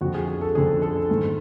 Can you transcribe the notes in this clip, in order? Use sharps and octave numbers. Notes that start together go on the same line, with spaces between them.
F2 D3 F#4
G#4
G#4
A4
F2 D3 G#4
A4
G#2 D#3